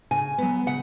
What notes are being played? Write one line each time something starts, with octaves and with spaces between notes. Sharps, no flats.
C#3 G#5
F#3 B3
C#3 F#5